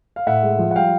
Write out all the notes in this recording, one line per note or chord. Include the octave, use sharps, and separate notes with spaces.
F5
A2 E5 F#5
G#3
F3
F#5
G3 F5 G5